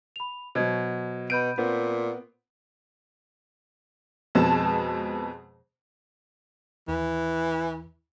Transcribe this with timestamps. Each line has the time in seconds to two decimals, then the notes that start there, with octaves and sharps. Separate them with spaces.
0.16 B5 F7
0.55 B2 F#3 C5 D#5 G#6
1.30 B2 B5 G6 D7 D#7
1.58 A#2 B3 C4
4.35 F2 B2 G#3 A5
6.88 D#2 E3